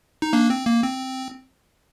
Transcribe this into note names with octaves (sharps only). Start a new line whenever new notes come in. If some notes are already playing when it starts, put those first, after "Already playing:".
D#4
A#3 D4
C4
A#3
C4